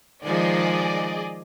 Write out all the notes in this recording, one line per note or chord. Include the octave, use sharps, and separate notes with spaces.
D#3 F3 G#3 G#4 D5 D#5